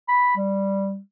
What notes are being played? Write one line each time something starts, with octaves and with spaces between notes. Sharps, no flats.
B5
G3